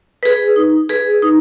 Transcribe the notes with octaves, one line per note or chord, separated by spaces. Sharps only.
G#4 B4
D#4
G#4 B4
D#4